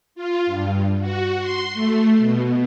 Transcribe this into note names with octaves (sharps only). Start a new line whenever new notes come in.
F4
G2
F#4
C6
A3
B2